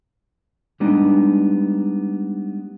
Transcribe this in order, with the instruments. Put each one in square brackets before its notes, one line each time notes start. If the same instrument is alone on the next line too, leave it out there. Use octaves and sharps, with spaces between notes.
[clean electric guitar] G3 G#3 B3 D4 D#4